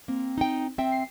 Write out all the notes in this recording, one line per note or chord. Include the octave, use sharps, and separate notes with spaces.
A#3 C4
D#4 G5
C4 E5 G5
C7